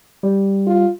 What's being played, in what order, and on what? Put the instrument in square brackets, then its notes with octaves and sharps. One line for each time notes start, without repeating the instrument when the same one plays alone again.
[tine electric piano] G3
[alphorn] F4